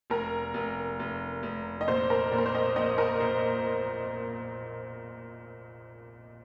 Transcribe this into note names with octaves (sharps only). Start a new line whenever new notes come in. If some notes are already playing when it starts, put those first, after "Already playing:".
F1 A#4
F1
F1
F1
D#5
A#2 C5
A#4
A#2
A#4
C5
D#5
A#1 D#5
A#4
A#2 C5